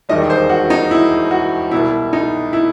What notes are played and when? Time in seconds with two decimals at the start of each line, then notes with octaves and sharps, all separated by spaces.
0.09 E1 D#2 D#3 G3 D#5
0.30 C5
0.49 F#4
0.70 D#4
0.91 E4
1.31 F#4
1.71 C2 B2 G3 E4
2.13 D#4
2.53 E4